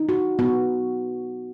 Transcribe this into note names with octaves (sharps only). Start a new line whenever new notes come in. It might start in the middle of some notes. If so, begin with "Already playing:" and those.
Already playing: D#4
F#4
B3 F#4